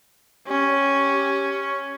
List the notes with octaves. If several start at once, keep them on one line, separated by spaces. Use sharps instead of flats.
C#4 G4